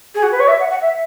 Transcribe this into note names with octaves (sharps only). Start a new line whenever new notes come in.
G#4
F#4
B4
C#5
E5
F#5
F#5
E5